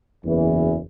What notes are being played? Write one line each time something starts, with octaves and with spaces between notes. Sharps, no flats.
F#1 E2 E3